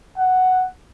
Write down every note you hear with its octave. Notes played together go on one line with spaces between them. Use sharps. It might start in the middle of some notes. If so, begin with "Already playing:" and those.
F#5